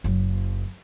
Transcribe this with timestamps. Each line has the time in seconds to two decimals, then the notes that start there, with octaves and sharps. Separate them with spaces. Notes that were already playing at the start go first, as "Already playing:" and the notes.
0.04 F#1 F#3